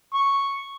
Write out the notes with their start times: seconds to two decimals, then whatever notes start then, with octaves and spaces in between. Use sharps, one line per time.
0.14 C#6